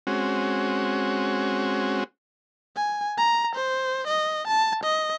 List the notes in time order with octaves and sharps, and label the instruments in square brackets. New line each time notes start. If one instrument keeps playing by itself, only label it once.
[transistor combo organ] G#3 C4 C#4 F#4
[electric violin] G#5
A#5
C5
D#5
A5
D#5